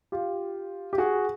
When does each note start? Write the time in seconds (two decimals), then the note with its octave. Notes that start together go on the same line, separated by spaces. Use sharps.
0.12 F4 G4
0.93 G4
0.98 F#4 G#4